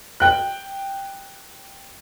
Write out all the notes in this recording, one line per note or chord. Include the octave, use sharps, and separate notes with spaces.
G5 F#6